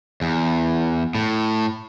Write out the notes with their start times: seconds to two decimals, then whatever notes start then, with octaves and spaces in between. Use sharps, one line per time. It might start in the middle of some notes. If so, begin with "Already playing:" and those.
0.21 E2
1.15 A2